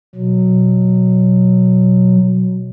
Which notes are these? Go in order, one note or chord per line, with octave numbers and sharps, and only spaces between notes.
B2 F#3